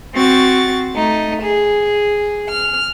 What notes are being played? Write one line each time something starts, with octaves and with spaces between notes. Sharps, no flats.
C4 F#4 C#6 A6
A3 D#4
G#4
F6